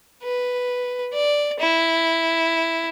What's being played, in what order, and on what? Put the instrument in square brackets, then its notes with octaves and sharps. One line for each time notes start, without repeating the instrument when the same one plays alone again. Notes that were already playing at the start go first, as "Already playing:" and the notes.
[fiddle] B4
D5
E4